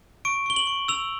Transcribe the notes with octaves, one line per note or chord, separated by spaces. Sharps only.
C#6 D7
C#6 G7
F#7
C#6
E6 F7